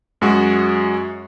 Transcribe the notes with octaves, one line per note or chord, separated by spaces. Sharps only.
F#2 G#3 F#4